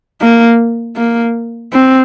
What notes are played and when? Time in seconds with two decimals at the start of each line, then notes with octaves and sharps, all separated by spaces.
0.21 A#3
0.97 A#3
1.73 C4